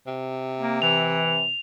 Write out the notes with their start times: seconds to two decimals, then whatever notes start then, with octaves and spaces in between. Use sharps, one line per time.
0.07 C3
0.59 A#3
0.82 E3 F7